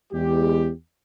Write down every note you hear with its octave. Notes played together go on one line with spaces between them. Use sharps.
E2 G#3 G4